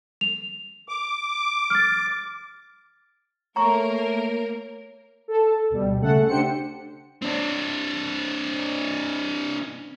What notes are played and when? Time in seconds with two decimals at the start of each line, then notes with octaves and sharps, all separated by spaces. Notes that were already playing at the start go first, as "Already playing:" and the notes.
0.21 F7
0.88 D6
1.70 F6 A6
3.56 A3 A#3 A#4 C#5 A#5 C#6
5.28 A4
5.70 D2 B2 G3
6.01 C#3 A3 A4 F#5
6.27 D4 G4 C5 C#7
7.22 C4 D4